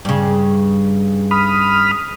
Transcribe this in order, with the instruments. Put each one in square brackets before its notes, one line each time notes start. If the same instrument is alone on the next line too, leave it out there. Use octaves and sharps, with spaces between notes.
[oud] G2 C#3
[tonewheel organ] B5 D#6 F6